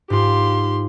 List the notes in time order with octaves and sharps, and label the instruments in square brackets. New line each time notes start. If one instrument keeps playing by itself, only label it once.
[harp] G#2 F4 [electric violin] G4 C6